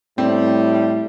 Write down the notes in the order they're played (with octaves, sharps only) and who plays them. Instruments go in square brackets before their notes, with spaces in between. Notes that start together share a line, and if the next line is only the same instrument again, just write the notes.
[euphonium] A2 [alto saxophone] G3 [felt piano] C4